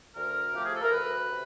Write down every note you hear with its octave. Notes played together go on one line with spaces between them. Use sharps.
D2 A#4
C3 F3 A3 G4
G#4
A4
A#4
D2 B4
C3